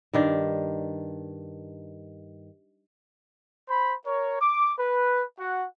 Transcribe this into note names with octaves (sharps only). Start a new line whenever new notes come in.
G2 D#3 D4
C5 B5
A#4 C#5
D6
B4
F#4 F#5